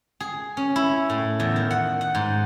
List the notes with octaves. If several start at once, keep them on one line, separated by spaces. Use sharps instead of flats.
G#4
C#4
E4
A2
E2
D#3
F#5
F#5
G#2